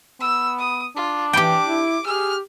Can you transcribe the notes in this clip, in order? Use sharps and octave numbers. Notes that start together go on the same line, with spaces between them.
B3 E6
D#6
D4 F4
E3 G4 G5 D6
E4
G4 G#4 F6